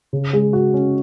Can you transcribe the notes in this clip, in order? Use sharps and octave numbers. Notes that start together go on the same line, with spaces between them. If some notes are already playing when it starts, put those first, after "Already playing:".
C#3
G#3
F#4
C#4